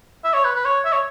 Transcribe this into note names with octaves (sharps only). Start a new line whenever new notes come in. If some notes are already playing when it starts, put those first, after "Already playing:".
E5
C#5
B4
B4
C#5
E5
C#5